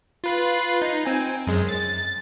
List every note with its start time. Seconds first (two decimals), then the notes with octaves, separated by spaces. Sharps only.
0.24 F4 B4 C7
0.82 D#4
1.06 C4 G#5
1.47 F#2 G#3
1.69 A6